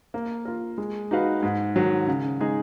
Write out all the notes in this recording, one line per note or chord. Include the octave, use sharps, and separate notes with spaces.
A#3
F4 A#4
G#3
D#4 F#4 B4 F5
G#2
D#3 F#3
C#3
G#3 D#4 G#4